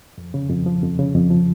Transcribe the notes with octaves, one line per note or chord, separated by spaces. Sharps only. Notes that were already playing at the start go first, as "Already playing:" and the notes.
F2
C#3
F2
F3
F2
C#3
F2
F3